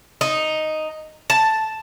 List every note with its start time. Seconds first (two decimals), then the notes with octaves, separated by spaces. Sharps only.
0.21 D#4
1.30 A5